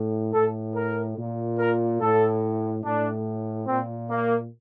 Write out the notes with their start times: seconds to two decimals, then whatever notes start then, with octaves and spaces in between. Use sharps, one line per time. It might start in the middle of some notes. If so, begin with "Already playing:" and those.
Already playing: A2
0.33 A2 A4
0.75 A#4
1.17 A#2
1.58 A#4
2.01 A2 A4
2.84 A2 D4
3.67 A#2 C4
4.09 A#3